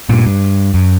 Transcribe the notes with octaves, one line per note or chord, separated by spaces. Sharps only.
G2 A#2
G2
F#2